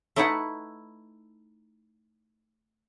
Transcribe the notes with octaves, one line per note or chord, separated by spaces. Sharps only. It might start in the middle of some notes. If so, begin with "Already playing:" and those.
A3 D#4 E4 B4 F#5